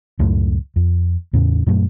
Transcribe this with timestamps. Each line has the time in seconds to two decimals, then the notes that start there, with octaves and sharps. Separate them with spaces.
0.19 C#2 F#2 A2 A3
0.76 F2
1.33 E2 A2 C#3
1.66 F#2 A#2 F#3 A3